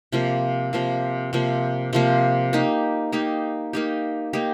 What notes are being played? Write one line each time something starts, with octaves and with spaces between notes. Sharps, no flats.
C3 F3 A#3
C3 F3 A#3
C3 F3 A#3
C3 F3 A#3
A#3 D#4 G4
A#3 D#4 G4
A#3 D#4 G4
A#3 D#4 G4